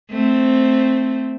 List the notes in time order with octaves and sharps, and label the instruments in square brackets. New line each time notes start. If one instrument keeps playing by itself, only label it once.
[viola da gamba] A3 C4